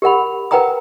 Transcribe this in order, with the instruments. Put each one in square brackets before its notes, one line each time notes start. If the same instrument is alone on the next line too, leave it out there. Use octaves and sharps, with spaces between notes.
[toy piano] G4 A#4 F#5 B5
A#4 B4 F#5 G5 A#5 D#6